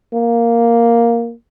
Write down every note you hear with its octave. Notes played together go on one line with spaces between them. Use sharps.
A#3